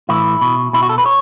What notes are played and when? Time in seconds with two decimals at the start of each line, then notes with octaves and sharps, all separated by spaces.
0.09 A2 E3 E4
0.41 B2
0.73 B2 E4
0.83 F#4
0.89 A4
0.98 B4
1.06 C#5